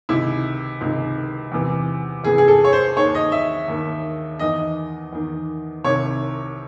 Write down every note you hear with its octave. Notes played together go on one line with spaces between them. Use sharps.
C#2 C3 D#3 E4
C#2 C3 D#3
E2 C3 E3
E2 C3 E3 G#4
G#4
A4
C#5
C5
D#2 D#3 C#5
D#5
E5
D#2 D#3
E2 D#3 D#5
E2 D#3
C2 C3 D#3 C#5